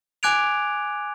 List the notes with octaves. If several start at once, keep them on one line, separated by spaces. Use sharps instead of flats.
G#5 D6 F#6 G#6 D7 F7